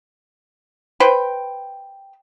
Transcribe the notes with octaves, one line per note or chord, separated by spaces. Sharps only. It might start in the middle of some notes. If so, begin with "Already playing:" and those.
B4 C5 G5